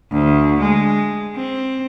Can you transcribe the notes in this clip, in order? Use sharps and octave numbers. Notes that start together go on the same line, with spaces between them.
D2
G#3
C4